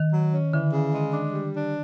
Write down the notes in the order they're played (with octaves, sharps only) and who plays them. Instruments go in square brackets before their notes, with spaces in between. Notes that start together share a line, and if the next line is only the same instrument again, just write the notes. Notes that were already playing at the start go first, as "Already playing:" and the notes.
Already playing: [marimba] D#3
[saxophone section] F#3
C#4
[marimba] D3 [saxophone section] E3
[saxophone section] C#3
G#3
D4
G3
D4